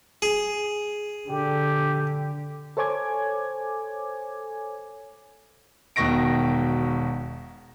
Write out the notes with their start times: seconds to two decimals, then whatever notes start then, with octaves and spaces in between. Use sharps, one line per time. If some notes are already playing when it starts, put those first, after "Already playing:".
0.22 G#4
1.29 D3 G4
2.77 A4 C5 C#5 G#5 D6 G#6
5.96 E1 B2 D#3 C#6 A#6 D7